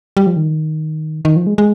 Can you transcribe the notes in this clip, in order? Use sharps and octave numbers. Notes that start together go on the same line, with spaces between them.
G3
F3
D#3
D#3
F3
G#3
G#3